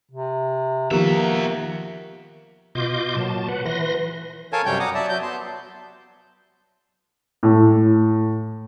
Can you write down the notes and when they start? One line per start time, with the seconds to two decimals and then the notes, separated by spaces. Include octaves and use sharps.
0.11 C3
0.91 D#3 F3 A#3 B3 F#4 G4 A#4 E5
2.75 B2 F4 D#5 C6 D6 G6
3.16 A#2 F#3 A5
3.48 B4 F#5
3.65 E3 B4 C6 A#6
4.53 A4 A#4 C#5 F5 G#5 A5
4.66 F#2 C3 G3 C#5 G5 G6
4.80 F#5 A#5 D6 D#6
4.94 F#3 D5 E5 A5
5.09 F#3 G6
5.23 B3 A5 C6
7.43 A2